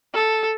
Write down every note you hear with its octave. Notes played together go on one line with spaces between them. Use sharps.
A4